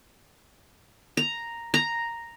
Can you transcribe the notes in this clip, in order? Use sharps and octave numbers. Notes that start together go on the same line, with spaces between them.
A#5
A#5